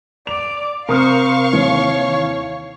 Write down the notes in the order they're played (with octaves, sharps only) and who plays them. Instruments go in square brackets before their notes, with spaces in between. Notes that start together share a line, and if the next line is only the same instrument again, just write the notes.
[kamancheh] D5 D6 [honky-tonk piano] F7
[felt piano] C3 [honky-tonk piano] A#4 D#6 F6 [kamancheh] C5 [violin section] F5 C#6
[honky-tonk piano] D#2 E3 [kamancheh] C#5